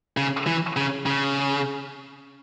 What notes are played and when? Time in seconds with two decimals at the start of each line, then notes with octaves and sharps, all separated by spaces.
0.17 C#3
0.47 E3
0.77 C#3
1.06 C#3